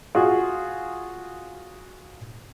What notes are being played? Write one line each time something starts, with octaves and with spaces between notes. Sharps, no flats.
F4 F#4 G#4